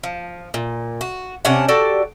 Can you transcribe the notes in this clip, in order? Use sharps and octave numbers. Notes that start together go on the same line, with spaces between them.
F3
A#2
F#4
C3 C#4 D4 F#5
F#4 G4 A4 D5